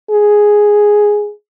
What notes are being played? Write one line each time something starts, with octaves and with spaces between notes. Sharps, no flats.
G#4